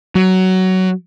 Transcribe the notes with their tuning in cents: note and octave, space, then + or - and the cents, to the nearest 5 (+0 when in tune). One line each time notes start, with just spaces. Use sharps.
F#3 +15